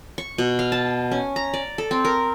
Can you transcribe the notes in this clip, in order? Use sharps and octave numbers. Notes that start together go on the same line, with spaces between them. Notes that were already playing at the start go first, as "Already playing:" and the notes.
C#6
B2
F5
A5
C#4
A#5
D5
A4
C4
A#4